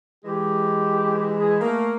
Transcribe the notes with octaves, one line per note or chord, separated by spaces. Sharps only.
E3 G#3 G4
G#4
A3 A#3